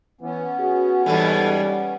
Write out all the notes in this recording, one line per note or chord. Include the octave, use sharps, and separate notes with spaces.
E3 B3 C#4
F#4 G#4
G#2 B2 E3 G3 A4